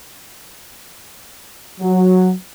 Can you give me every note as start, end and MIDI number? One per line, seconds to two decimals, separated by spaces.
1.80 2.30 54